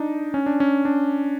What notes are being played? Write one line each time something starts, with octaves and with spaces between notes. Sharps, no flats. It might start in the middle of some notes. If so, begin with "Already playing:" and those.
Already playing: D4 D#4
C#4
D4
C#4
D4